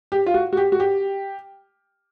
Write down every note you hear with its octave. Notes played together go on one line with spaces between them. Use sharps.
G4
F4
F#4
F#4
G4
F#4
G4